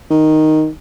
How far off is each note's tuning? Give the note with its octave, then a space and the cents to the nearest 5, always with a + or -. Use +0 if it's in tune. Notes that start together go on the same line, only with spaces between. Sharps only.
D#3 +0